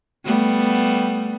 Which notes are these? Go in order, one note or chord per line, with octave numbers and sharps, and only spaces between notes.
G3 A3 B3